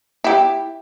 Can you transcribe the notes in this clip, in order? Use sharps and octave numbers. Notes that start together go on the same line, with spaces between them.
E4 G4